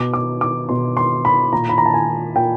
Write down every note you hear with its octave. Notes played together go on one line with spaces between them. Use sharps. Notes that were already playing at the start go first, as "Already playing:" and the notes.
Already playing: B2 D6
D6
D6
B2 C6
C6
B5
A#2 A#5
B5
A#5
A5
G#5
A#2 G5